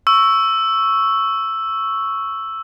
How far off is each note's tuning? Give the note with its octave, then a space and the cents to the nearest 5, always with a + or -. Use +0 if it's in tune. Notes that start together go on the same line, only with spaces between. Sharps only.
C#6 +0 E6 +0